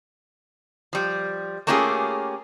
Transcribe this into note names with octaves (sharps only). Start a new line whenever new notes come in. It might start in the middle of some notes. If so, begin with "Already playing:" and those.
F3 G3
A3 A#3 C#4 F4 G4 G#4